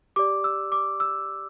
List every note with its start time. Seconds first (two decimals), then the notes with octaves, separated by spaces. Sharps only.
0.16 G4 D5 D6
0.44 E6
0.72 D6
1.00 E6